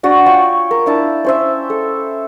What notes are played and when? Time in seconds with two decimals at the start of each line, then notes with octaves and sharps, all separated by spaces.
0.03 D4 F#4 D5
0.26 F4 C#5 G5 C#6
0.71 A#4
0.86 D4 E4 A5
1.24 C#4 C5 E5
1.70 A4